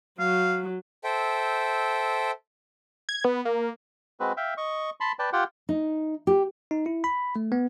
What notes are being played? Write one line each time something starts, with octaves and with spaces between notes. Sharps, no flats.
F#3 F5
A4 C5 E5 G5
G#6
B3
A#3
G#3 C4 F#4 B4
E5 F5 G5
D#5 C#6
A5 B5 C6
B4 D5 G5 A5
F4 G4 F#5 G5
D#4
G4
D#4
E4
B5
A3
B3